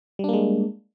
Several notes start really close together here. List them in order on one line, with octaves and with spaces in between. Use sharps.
G3 D4 A#3 G#3